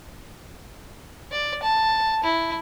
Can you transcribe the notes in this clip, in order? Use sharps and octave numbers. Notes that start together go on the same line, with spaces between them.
D5
A5
E4